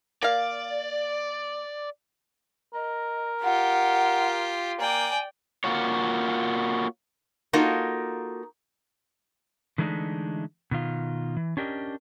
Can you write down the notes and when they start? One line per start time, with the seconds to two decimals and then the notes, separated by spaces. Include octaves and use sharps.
0.23 A#3 D5 F5
2.74 A#4 D#5
3.43 F4 G4 F#5
4.80 A#3 D5 G5 G#5
5.64 A#3 F4 F#4 C#5
7.53 A#3 D#4 F4 F#4 A4 A#4
9.78 D3 E3 G#3 A3 D4 D#4
10.71 B2 D#3 F4
11.37 E3
11.57 C#4 D4 G4 A#4 D#5